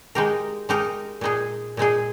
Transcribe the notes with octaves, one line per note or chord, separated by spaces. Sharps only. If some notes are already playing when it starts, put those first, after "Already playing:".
G#3 D#4 G4 A#4
G#3 D#4 G4 A#4
A#2 G#3 D#4 G#4
A#2 G#3 D#4 G#4